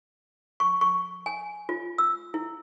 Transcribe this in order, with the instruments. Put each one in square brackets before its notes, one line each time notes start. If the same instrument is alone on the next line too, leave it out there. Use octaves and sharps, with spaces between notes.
[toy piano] C#6
C#6
G#5
F4
E6
E4